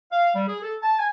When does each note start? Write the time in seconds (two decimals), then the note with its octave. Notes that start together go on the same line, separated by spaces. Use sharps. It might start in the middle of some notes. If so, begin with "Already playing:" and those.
0.12 F5
0.34 G3
0.47 G#4
0.63 A4
0.82 A5
0.98 G#5